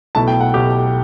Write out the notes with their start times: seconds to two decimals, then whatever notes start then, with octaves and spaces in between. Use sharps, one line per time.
0.15 B1 B2 A3 E4 A5
0.28 G5
0.40 F#5
0.54 B1 B2 A3 E4 G4